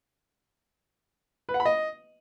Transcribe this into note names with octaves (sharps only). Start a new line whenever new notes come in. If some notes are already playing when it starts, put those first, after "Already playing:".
B4
F#5
B5
D#5